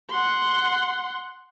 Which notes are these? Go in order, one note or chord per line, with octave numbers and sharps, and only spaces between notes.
F#5 C6